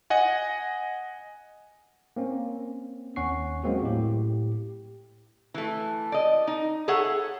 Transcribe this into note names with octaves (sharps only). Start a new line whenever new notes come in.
D#5 F#5 G#5
A#3 C4 C#4
D#2 C#4 F#5 C#6 C7
F#3 G#3 A#3 C4 F#4
A2 G4
E3 A3
D5 D#5
D#4
G#4 A4 C#5 E5 F#5